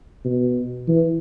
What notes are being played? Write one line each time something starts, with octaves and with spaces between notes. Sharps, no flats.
B2
E3